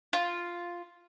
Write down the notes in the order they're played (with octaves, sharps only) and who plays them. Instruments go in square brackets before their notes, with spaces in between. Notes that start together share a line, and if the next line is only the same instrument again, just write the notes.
[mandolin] F4